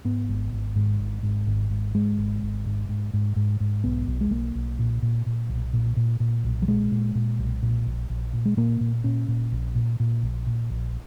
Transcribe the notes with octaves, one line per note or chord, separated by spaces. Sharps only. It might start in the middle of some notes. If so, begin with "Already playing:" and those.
G#2 B3
G#1
G#1
G#2
G#1
G#2
G#1
G#2
G#2 G#3
G#1
G#1
G#2
G#2
G#2
G#2
G#2
B1 B3
B1
G#3
B1 A#3
B1
A#2
A#2
A#2
B1
A#2
A#2
A#2
B1
F#3
A#2 G#3
A#2
A#2
B1
A#2
A#1
A#1
A#2
G#3
A#2 A#3
A#2
A#2 C#4
A#2
A#1
A#2
A#2
A#1
A#2
A#1